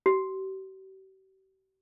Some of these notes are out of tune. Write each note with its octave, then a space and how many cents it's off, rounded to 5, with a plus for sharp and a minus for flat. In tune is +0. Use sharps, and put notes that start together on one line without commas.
G4 -45